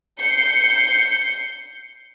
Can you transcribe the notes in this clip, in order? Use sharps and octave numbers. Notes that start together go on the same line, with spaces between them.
G6 C7 C#7